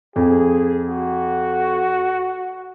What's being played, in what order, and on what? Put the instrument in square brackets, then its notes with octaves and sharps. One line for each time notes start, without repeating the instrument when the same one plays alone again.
[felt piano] F2 [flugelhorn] G#4
[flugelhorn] F#4